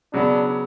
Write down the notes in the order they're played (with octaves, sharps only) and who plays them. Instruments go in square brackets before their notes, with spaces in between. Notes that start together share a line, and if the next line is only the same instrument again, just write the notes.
[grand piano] C#3 F#3 B3 [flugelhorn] D4